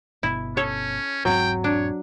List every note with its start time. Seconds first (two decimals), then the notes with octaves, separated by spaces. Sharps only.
0.23 G1 B2 E4
0.57 C#4 A4 C#5
1.25 E1 G#2 F#3 C4 G5
1.64 D4 C#5